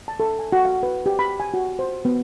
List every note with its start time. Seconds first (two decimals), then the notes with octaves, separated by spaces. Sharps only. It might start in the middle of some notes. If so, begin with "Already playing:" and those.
0.08 A5
0.20 A4
0.39 G#5
0.52 F#4
0.65 F5
0.83 B4
1.06 G4
1.19 B5
1.40 G#5
1.54 F#4
1.79 C5
2.05 B3